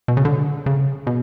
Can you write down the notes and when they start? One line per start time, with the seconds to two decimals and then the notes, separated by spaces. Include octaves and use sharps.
0.08 B2
0.17 C#3
0.25 D3
0.66 C#3
1.07 B2